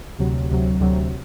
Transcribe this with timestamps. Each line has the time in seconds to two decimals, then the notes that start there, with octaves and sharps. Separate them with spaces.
0.19 D2 C3 F#3
0.50 D2 C3 F#3
0.80 D2 C3 F#3